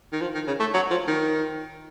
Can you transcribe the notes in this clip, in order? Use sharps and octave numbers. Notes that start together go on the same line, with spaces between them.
D#3
F3
D#3
C#3
A3
F#3
F3
D#3